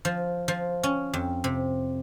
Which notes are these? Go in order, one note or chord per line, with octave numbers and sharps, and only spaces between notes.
F3
F3
C#4
F2
C3